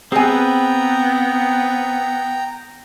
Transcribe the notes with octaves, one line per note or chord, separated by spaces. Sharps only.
B3 C4 G#4 B4 G5 G#5 A#5